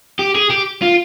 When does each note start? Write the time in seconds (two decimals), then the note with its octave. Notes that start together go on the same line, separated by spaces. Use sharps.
0.19 G4
0.35 G#4
0.51 G4
0.83 F4